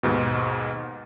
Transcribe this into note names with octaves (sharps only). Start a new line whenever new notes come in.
D#2 G#2 B2